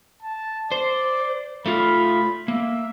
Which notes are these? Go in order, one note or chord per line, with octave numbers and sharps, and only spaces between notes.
A5
C5 D5
A3 F4 B5
A#3 E5